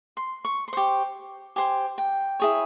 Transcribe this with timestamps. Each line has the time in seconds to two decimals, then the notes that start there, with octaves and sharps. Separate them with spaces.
0.17 C6
0.45 C#6
0.68 C6
0.73 G4 C5 C#6
1.56 G4 C5 G#5
1.98 G5
2.40 E4 G#4 C#5